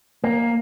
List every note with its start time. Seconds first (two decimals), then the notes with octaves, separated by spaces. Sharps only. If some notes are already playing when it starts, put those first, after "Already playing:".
0.24 A#3